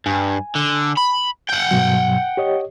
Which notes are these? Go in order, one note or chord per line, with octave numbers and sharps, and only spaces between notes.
G2 G#5
D3
B5
F#5 G5
G2 B2 F#3
G4 C#5 D#5